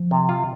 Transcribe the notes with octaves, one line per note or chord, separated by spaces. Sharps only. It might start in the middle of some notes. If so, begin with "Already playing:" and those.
Already playing: F3
C3
F4